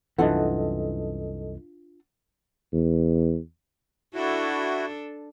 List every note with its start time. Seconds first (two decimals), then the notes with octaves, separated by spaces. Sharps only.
0.18 C2 F#2 E3 D4 F4 A4 D#5 F#5
2.73 E2
4.14 D4 E4 F#4 A4